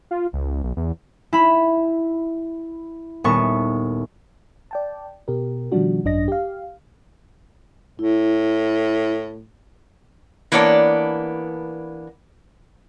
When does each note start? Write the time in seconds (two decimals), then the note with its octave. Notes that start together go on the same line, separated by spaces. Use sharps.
0.11 F4
0.33 C#2
0.64 B1
0.77 E2
1.33 E4 B5
3.24 D#1 B3 A4 C#6
4.71 D5 G5 A5
5.28 B2 G4 A#4
5.72 B2 D#3 F3 G3 D4 F#4
6.05 G#1 F#2 D4 D#5 A#6
6.28 G4 F5
7.99 A2 E4
10.52 E3 A#3 B3 D4 C#5 D5